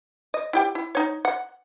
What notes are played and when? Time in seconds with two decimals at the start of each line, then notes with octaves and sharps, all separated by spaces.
0.34 D#5
0.53 E4 G4 G5
0.75 E4
0.95 D#4 C#5
1.25 F#5